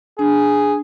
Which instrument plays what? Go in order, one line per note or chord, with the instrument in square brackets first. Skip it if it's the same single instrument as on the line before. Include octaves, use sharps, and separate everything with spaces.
[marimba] D4 [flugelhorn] G#4